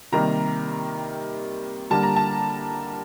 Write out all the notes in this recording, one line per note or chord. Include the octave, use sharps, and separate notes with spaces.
C3 D#3 G3 A#3 A#5
D3 G3 A#3 A5
A#5
A5